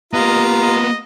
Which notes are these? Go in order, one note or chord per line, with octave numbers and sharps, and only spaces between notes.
A#3 B3 F4 G4 D#5 A#5
D#5